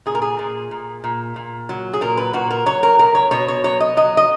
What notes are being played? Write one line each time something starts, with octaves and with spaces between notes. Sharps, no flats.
A#2 G#4
A#4
G#4
A#2
A#2
A#2
A#2
F#3
G#4
A#2 A#4
B4
A#2 F#4
A#4
F#3 C#5
A#4
B2 A#4
C#5
B2 C#5
C#5
F#3 C#5
D#5
F#3 D#5
D#5